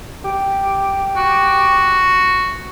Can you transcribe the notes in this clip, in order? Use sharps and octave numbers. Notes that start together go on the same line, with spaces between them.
G4
F#4